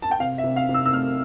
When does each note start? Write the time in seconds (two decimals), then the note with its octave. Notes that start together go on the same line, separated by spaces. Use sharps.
0.02 A5
0.11 G5
0.20 C3 F5
0.38 E5
0.44 C3
0.56 F5
0.69 C3
0.74 E6
0.86 E6
0.93 A3 F6